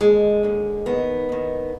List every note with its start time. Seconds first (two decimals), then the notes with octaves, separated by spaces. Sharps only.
0.01 D#2 D3 G#3
0.43 D#2 D3
0.86 D#2 D#3 B3
1.29 D#2 D#3